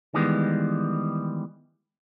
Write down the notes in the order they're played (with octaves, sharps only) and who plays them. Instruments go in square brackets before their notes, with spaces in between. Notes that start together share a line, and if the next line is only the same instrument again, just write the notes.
[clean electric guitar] D#3 E3 G3 G#3 B3